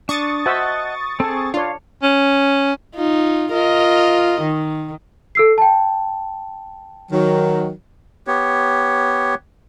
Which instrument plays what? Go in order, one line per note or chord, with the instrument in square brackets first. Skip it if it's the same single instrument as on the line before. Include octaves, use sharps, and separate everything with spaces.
[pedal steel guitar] D4 [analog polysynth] C#6 D#6 A6
[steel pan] F#4 C5 E5 [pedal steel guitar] D#5 F#5 A5
[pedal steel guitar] C4 G#4 [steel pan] A4
[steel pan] D4 C#5 [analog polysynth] F4 [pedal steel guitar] F5
[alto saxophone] C#4
[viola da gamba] D#4 F4
F4 A#4 D#5
D#3
[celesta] A4 E6 C7
G5 A5
[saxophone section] D#3 F#3
[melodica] B3 G4 C#5